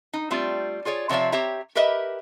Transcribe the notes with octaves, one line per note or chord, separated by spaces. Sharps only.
D#4
G3 A3 C4 F4 D5
F4 G#4 C#5 D5
C3 F3 C#5 D5 E5
C4 G4 C#5 E5 A#5
G4 A#4 B4 D#5 E5